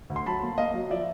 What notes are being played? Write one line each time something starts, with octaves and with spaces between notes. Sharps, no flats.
D2
C6
F#3 A5 B5
A#3
A#3 D#5 F5
F#3
F3 D5 E5